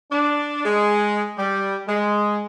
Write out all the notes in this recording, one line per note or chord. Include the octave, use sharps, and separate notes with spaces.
D4
G#3
G3
G#3